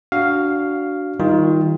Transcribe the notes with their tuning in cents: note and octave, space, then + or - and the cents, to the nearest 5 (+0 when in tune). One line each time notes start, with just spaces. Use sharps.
D4 -10 F#4 +10 F5 +0
D#3 +25 G3 +0 F4 +0